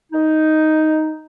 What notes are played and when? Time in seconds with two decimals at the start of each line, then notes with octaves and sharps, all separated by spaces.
0.12 D#4